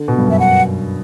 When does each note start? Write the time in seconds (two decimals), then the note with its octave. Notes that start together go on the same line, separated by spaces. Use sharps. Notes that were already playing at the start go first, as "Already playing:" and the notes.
Already playing: D3
0.08 B2
0.18 G2
0.27 F#2 E5
0.39 F#5